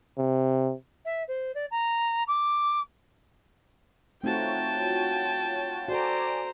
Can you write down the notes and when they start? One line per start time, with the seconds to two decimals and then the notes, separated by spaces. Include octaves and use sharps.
0.18 C3
1.05 E5
1.28 C5
1.54 D5
1.71 A#5
2.27 D6
4.24 A3 C4 D#4 F4 F#4 C#5 G5 A5
5.88 F#4 A4 C5 D5 G#5 A#5 D7